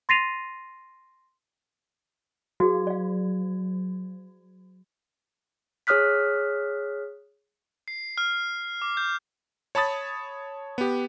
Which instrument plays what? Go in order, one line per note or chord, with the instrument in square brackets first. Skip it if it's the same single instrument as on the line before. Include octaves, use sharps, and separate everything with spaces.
[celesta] C6 A6 A#6 C7 D#7 F7
[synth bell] F#3 [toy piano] F#4 G#4
[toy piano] D5 F5
[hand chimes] G#4 C#5 D#6 F6 F#6 B6
[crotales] C7
F6
D6
G6
[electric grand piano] C#5 A5 B5 D#6 A6
B3 G4